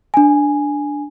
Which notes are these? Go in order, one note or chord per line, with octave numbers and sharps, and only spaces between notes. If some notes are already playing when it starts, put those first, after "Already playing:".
D4 G#5